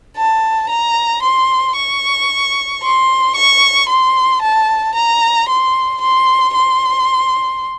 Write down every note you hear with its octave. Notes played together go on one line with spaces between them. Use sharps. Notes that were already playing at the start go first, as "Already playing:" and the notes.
A5
A#5
C6
C#6
C6
C#6
C6
A5
A#5
C6
C6
C6